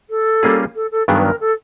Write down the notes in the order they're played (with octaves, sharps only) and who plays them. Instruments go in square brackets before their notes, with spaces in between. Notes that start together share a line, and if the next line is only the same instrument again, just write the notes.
[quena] A4
[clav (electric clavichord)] G3 A#3 C#4 F4 G#4
[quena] A4
A4
[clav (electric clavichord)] G2 D#3 F#3 B3 D4 [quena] G#4
[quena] B4
A#4
A4